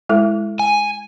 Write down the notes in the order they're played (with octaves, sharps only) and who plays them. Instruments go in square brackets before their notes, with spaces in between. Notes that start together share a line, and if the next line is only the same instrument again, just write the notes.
[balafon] G#3 E4 A4
[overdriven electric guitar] G#5